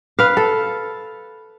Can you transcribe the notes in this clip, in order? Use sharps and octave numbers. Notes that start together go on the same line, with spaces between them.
B4 F5
A4